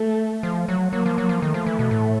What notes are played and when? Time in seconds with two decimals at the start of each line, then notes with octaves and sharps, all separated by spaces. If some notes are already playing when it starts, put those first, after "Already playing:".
Already playing: A3
0.43 F3
0.68 F#3
0.92 F#3 A#3
1.06 F3
1.18 F#3
1.29 F3
1.42 D#3 A3
1.54 F3
1.67 E3
1.79 B2
1.91 A2